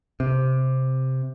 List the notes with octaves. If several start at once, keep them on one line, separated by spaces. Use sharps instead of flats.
C3